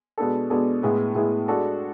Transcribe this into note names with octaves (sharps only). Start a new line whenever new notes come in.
B2 G#3 B3 D4 A4
B2 G#3 B3 D4 A4
A2 G#3 B3 E4 G#4
A2 G#3 B3 E4 G#4
G#3 D4 F#4 A4